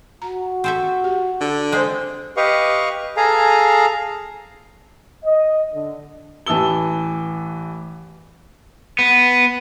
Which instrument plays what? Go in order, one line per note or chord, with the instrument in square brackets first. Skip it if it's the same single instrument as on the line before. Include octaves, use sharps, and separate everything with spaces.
[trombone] F#4 [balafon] A#5
[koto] C4 A4 E5
[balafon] G4
[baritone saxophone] D3
[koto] G#3 C4 [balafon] A4 C5
[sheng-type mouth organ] G4 B4 D#5 F5 C#6
G#4 A4 F5 G#5 A#5
[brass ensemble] D#5
D3
[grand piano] A1 E3 A5 E6 G7
[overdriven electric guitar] B3